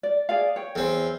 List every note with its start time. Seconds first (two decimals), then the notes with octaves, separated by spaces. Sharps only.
0.03 D5
0.29 G#4 D5 F5
0.56 C#5 G5
0.75 E2 C4